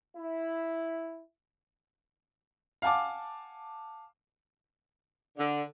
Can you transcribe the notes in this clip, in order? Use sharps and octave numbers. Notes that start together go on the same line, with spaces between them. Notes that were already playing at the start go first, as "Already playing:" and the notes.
E4
F5 F#5 G#5 A5 D6
D3